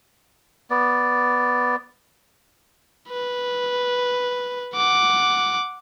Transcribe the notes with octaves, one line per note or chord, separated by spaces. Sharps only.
B3 D5
B4
F#5 D6